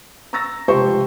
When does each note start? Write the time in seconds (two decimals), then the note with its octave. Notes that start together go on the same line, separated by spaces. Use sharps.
0.33 A#5 C#6 E6 A6 A#6
0.68 F1 C#2 G4 C5 A5 C#6